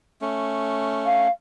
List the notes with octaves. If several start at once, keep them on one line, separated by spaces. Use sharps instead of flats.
A3 C#4
F5